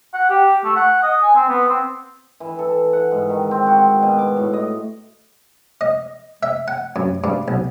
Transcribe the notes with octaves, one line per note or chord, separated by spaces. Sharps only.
F#5
G4
A3
F#5
D#5
G#5
C4
B3
C4
E3
A4
F#5
G#2
D#3
C4
F#4
C4
B2
D6
A2
D#5
D#5
E5
F#5
F#2
G2
B1